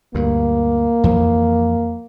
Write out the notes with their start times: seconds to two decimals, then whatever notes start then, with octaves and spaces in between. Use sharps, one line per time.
0.15 D2 G2 A#3
1.04 F2 E3 F3